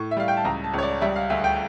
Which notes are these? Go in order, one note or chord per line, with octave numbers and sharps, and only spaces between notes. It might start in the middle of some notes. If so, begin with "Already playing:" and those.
Already playing: A2 C#6
E5
G3 F5
G5
A5
C#2 A#5
A5
C#2 C#5
D5
G3 E5
F5
D2 E5
G5